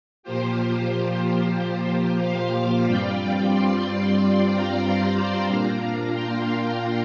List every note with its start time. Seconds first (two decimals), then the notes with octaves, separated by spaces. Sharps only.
0.23 A#2 F3 A#3 F4 G4 C5
2.20 C5 F5
2.85 G2 G3 C4 F4 D5 G5
3.50 G5 C6
4.16 G5 C6
4.49 F5 A#5
4.82 D5 G5
5.14 C5 F5
5.47 A#2 A#3 D4 F4 F5 A#5
6.13 G5 C6